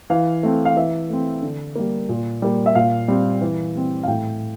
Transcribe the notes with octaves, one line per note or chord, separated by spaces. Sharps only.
E3 F5
A3 C4
F5
E3 E5
A3 C4
D3
G3 A#3
A#2
G3 A#3
E5
A#2 F5
G3 C4
E3
G3 C4
F5
A2 G5